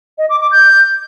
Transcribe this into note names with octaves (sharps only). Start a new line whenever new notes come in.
D#5
D6
D6
G6